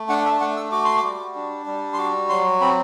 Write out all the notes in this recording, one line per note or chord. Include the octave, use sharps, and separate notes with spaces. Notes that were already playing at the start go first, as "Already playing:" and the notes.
Already playing: A3
D4 F#5
E5
A3 F#5
E6
F#4 D6
C6
D6
G3
D4
G3
C6
F#4 D6
F#3 C6
C4 B5